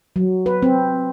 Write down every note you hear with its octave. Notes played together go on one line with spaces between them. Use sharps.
F#3
B4
C4